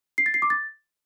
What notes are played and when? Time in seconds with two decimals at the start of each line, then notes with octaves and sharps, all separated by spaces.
0.18 C7
0.26 A6
0.34 C7
0.42 D6
0.50 A6